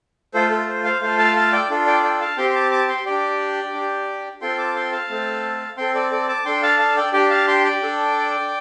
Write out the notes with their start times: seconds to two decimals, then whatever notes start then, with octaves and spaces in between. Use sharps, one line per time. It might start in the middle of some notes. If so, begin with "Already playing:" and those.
0.34 A3 F4 A4 C5
0.50 A4
0.68 C5
0.84 C5 F5
1.02 A3 F4 A4 C5 F5
1.18 F5 A5
1.36 F5 A5
1.52 D5 G5
1.70 D4 F4 A4
1.86 D5 G5
2.03 D5 G5
2.21 F5 A5
2.37 C4 G4 G5 C6
2.50 C6
2.55 A5 D6
2.71 A5 D6
2.88 G5 C6
3.05 D4 G4 D5 G5
3.74 D4 G4
4.41 C4 F4 A4 G5 C6
4.58 A5 D6
4.75 G5 C6
4.92 F5 A5
5.10 A3 C4 A4
5.77 C4 A4 G5 C6
5.94 A4 D5
6.11 A4 D5
6.28 A5 D6
6.45 D4 A4 G5 C6
6.62 F5 A5
6.79 F5 A5
6.96 D5 G5
7.13 D4 G4 D5 G5
7.30 F5 A5
7.47 G5 C6
7.64 D5 G5
7.82 D4 A4